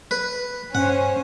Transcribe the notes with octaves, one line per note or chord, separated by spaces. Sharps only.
B4
G2 C#4 C5 F#5